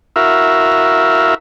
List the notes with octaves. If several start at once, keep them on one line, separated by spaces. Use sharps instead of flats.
E4 F#4 A#4 E5 F5